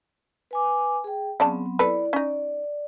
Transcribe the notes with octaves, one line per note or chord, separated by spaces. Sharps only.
B4 G#5 D6
G#4 G5
C#3 F#3 B3 C4 D5 A5
E4 A4 B4 D5
C#4 D#4 D5